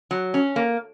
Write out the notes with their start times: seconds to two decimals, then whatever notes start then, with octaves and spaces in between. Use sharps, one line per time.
0.11 F#3
0.34 C#4
0.56 A#3